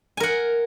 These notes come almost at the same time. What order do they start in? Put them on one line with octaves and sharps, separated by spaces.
G#5 A#4 F#5